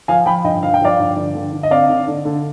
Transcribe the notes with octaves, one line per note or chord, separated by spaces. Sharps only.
F3 F5 G#5
F3 G5 B5
G2 D#5 G5
F3 F5
G5
F3 D5 F5
G2
D3
D3
D3
D#5
C4 D5 F5
D3
D3
D3